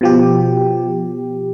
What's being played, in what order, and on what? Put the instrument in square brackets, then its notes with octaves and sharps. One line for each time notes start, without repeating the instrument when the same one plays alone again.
[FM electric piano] B2 F3 G4